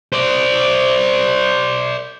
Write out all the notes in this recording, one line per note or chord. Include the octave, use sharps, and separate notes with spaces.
C5 D5